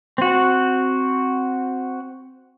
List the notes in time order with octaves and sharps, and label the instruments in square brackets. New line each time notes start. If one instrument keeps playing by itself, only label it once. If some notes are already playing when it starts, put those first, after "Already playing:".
[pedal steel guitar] C4 F#4